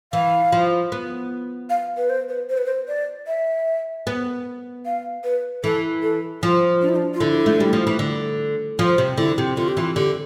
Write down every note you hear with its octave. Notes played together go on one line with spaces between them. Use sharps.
E3 F5
F3
B3
F5
B4
C5
B4
C5
B4
C5
D5
E5
B3
F5
B4
E3 A4
A4
F3 F4
D4
E4
D4
F4
D3 E4
A3
G3
F3
E3
D3
F3 F4
C3
D3 E4
C3
D3 F4
G4
E3 F4
D3 G4